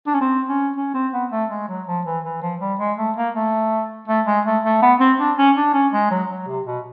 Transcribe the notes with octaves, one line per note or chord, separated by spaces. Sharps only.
D4
C#4
C4
C#4
C#4
C4
B3
A3
G#3
F#3
F3
E3
E3
F3
G3
G#3
A3
A#3
A3
A3
G#3
A3
A3
B3
C4
D4
C#4
D4
C#4
G#3
F#3
F#3
C3
B2